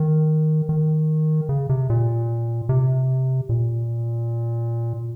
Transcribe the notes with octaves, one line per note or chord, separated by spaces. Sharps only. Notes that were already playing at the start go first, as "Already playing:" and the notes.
Already playing: D#3
D#3
C#3
C3
A#2
C3
A#2